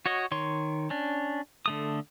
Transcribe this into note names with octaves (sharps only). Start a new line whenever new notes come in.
F#4 C#5 D#5
D#3 C#5 C6
C#4 D4
D3 A3 D#6